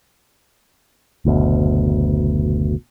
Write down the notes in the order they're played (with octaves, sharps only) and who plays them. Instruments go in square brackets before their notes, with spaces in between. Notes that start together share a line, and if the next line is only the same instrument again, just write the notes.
[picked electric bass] F#1 D2 B2